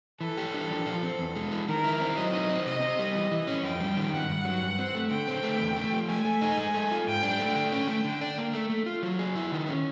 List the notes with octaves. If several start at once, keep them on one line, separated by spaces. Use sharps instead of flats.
E3 A4
G4
D4
F3
F3
C4
E2
G#3
E3
D#3 A#4
E4
C4
F#3 D#5
D#4
C4
C3 D#5
C4
G3
E3 D#5
E3
C#4
F2 G5
G3
D#3
G2 F#5
G2
F#3
G2
C4
A3
D3 G5
C4
A3
E2
A3
F3
A3 G#5
A3
D#4
G#3
A4
F4
G#2 G5
D4
A3
D3 G5
C#4
A3
D3
D4
A#3
A3
A3
F4
F#3
G#4
E4
D#3
C#4